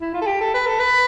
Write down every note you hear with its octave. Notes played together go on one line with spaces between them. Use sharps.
E4
F4
A4
G4
A4
B4
A4
B4